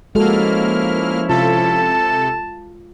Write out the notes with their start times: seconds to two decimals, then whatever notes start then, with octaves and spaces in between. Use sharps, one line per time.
0.15 F3 G#3 A#3 C#4 E4 F#4 A4 F6
1.29 C3 F4 A4 A5